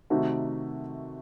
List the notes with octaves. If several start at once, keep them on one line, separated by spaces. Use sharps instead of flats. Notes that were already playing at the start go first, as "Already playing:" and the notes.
C3 D#3 A3 D#4 F#4